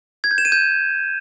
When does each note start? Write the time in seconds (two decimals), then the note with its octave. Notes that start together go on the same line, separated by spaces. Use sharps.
0.24 G#6
0.31 G6
0.38 E7
0.45 D#7
0.52 G6